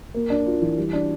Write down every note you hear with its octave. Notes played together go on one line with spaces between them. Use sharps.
A#3
D4
F4
E3
G3
D4